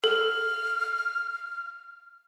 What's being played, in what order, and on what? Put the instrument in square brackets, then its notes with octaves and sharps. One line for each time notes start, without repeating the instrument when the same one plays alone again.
[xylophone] A4 [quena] F6